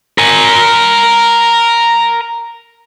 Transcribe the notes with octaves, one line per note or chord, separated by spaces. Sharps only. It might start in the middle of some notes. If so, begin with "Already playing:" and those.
A#4 G#5